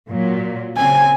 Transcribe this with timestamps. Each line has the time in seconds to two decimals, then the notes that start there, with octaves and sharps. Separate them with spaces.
0.10 A#2 F#3
0.77 C#3 C4 G#5